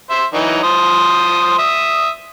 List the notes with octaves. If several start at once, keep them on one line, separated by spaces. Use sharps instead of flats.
C5 E5
E3 F#3 D#4
F3 C5 D#6
E5 D#6